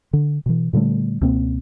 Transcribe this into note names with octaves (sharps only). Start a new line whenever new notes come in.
D3
B2 E3
A#2 D3 G3 A3
C#2 B2 A#3 C4